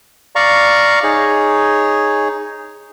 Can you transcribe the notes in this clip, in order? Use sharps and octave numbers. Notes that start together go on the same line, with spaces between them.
D5 F5 A#5 C#6
D#4 G#4 C#5